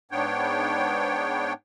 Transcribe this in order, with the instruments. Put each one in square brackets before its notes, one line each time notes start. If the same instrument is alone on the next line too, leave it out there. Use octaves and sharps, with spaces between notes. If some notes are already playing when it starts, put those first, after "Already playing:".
[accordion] G#2 B3 D4 C#5 G5